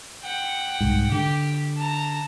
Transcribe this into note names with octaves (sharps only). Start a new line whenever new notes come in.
F#5 G5
C2 G#2
D3 G4
A5 A#5